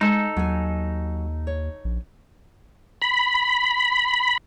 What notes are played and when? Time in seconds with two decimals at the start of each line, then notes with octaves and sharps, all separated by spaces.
0.01 G#3 D#4 A4
0.37 D#2 F#3 G#5
1.47 C#5
1.85 A#1
3.02 B5